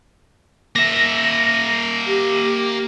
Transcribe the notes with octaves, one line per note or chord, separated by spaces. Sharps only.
A#3 E5 A#6
G4